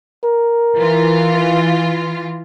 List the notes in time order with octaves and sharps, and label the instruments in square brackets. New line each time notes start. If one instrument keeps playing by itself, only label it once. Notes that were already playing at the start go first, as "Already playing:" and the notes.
[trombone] A#4
[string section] E3 F4